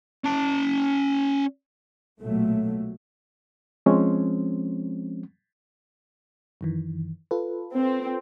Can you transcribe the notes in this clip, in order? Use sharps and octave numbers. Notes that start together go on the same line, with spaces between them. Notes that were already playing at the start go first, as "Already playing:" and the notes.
C#4 A5
B1 A#2 F#3 A3
F3 G#3 C4 C#4
F#2 D#3 E3
F4 A4 B4
C4